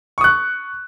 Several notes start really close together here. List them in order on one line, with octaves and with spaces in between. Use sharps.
C#6 D#6 F#6